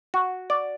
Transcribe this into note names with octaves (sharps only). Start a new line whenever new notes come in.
F#4
D5